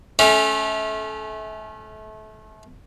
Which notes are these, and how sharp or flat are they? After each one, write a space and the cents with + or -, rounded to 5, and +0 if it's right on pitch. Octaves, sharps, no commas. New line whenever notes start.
A3 -30 C#4 +0